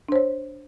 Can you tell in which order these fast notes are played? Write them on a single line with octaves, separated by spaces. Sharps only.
D4 C5 C#5